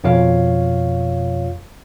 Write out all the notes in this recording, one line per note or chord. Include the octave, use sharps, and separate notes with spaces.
F2 B2 F4 C#5 F5